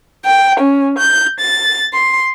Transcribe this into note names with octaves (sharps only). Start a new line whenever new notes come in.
G5
C#4
G6
A6
C6